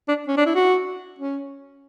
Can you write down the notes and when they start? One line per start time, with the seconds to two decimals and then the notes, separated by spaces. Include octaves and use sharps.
0.08 D4
0.28 C#4
0.37 D4
0.46 E4
0.55 F#4
1.19 C#4